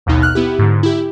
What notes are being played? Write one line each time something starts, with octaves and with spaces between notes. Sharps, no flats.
A1 D#2 B2 D#4
F6 F#6
B3 E4 G4
G#2 D3
E4 G4